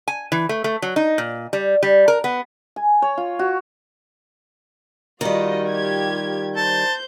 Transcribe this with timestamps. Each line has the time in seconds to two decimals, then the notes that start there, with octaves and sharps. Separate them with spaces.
0.08 G#5
0.32 E3
0.49 A3
0.64 A3
0.82 F#3
0.96 D#4
1.18 A#2
1.53 G3
1.83 G3
2.08 A#4
2.24 B3
2.76 G#5
3.02 C#5
3.18 F4
3.39 F#4
5.21 D#3 G3 F4 F#4 D#5
5.70 F4 G4 G#6
6.57 C5 A5 G6